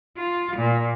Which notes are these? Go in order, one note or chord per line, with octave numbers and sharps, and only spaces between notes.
F4
A#2